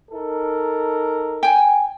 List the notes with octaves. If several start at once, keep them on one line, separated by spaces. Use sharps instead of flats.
D#4 A4 A#4
G5 G#5